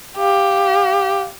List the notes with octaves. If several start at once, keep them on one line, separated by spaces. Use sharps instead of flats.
G4 F5